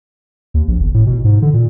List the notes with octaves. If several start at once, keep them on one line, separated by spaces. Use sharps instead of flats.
D#2
A#1
G1
A2
B2
G#2
D3
A#2